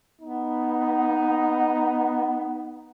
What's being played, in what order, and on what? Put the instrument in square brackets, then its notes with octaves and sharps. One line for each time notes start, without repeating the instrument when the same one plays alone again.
[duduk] B3 [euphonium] D#4